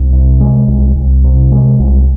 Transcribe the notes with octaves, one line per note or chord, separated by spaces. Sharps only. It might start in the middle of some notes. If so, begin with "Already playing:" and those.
Already playing: C2
C3
G#3
C2
C2
C3
G#3
C2